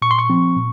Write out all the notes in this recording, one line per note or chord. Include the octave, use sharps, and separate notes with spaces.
A#2 C#6
C6
C#6
F3 C4
A#2